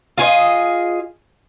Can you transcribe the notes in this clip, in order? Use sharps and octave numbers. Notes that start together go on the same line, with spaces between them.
F4 G#4 C5 D#5